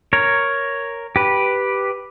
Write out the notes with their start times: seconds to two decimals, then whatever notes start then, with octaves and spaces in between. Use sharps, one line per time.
0.13 A#4 C#5
1.16 G4 B4